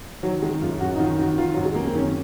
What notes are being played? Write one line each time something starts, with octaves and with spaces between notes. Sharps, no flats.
D#3 F#3
D#3 G#3
F#2 F4
F#2 F#4
D#4
D#3 F4
D#3 F#4
D#3 F4
F#2 F#3
G#3
F#2 A#3
C4
D#3 C#4